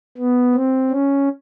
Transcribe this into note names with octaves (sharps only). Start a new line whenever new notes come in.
B3
C4
C#4